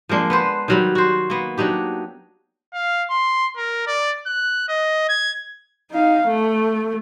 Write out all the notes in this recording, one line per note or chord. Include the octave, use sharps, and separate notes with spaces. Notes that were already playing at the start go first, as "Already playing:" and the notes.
F3 G#3 A#3 D4
B3 B4 C5
D#3 F#3 G3
F#4 C5
A#3 B3
F#3 D4 D#4 G4
F5
C6
A#4
D5
F#6
D#5
G#6
D#4 F5
A3